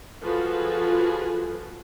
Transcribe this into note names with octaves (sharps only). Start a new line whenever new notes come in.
F3 F4 F#4 G#4 A4 B4